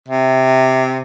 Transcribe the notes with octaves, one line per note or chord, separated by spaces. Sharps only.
C3